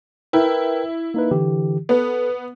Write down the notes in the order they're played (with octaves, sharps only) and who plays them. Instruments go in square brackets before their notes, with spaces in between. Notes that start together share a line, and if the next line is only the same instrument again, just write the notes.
[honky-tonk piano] E4 [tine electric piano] A#4 B4 G5
[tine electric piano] A#3 D#4 B4
D3 E3 G4
[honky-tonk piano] B3 [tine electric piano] A4 B4